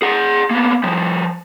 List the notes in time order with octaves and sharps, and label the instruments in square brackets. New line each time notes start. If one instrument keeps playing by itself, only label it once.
[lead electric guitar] G#4 F#5
A#3 B3
F3 G3